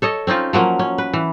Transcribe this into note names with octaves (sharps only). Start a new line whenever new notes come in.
A4 C#5 D#5
C4 C#4 D#4 F4
F3 F#3 A#3 C#4
C#4
B4
E3